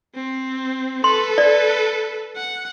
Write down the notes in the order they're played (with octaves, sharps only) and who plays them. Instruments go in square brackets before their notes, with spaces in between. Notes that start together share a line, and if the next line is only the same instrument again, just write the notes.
[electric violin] C4
[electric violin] A4 B4 [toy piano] C6
[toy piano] D5
[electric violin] F#5